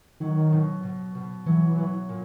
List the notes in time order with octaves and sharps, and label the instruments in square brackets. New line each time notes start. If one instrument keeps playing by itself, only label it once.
[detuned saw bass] D#3 [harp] F#3
[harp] B2
B2
B2
[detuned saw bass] E3 [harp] F#3
[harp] F#3
A#2